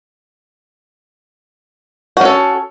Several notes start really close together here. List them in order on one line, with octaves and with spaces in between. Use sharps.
F#4 C#4 A4